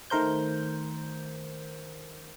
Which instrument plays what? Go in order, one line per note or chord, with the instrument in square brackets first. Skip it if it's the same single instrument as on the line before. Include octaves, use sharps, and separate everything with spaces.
[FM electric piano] D#3 A3 A#4 C5 G6